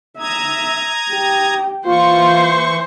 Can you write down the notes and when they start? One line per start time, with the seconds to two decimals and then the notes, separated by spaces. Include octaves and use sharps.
0.19 E5 A#5 D#6 G#6
1.11 G4
1.86 E3 A#3 F4 C5 C#6